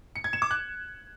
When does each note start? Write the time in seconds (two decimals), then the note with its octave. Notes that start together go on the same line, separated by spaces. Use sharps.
0.16 C#7
0.24 G#6
0.33 E7
0.42 D6
0.51 F#6